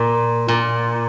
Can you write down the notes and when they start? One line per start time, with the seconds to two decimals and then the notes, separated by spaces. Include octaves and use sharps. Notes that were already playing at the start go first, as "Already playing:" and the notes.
Already playing: A#2
0.48 A#2